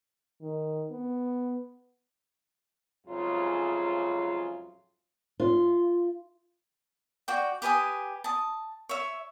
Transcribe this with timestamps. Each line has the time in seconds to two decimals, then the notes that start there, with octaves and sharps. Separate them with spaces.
0.41 D#3
0.91 B3
3.07 F2 G#2 C#3 F#3 E4 F4
5.40 F4
7.28 F#4 D5 G5
7.62 G4 B4 G#5 D#6
8.24 A5 D#6
8.89 C#5 E5